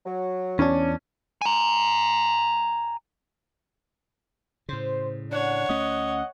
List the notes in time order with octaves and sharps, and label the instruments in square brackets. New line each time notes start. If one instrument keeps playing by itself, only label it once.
[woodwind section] F#3
[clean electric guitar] E2 D4 [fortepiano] C#4
[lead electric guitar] G#5 A#5
[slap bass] A2 C#3 [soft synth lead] C5
[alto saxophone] D4 [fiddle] C#5 [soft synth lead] F#5
[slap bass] D2 A3 C#4 [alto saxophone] D#5